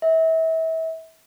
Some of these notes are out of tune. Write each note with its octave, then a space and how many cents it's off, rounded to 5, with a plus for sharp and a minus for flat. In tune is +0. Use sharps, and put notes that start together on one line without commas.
E5 -30